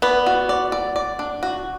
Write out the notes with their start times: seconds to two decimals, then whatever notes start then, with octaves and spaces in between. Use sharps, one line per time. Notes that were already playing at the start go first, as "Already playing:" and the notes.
0.02 B3 D5
0.26 F#4
0.49 D5
0.72 D5
0.96 D5
1.19 D4
1.43 F#4